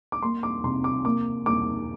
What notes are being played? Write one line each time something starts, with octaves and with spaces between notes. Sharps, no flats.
D6
A#3 C6
D6
C3 C6
D6
A#3 D6
A#3 D6